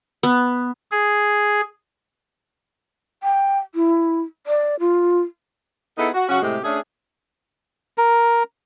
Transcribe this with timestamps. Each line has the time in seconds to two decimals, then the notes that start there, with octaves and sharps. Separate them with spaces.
0.23 B3
0.91 G#4
3.23 G5
3.75 E4
4.47 D5
4.80 F4
5.98 B3 D#4 E4 G#4 A4
6.14 F#4
6.29 C#3 F#3 C#4 F#4
6.42 A2 C3 G#3 G4
6.64 A3 C#4 D4 G#4
7.98 A#4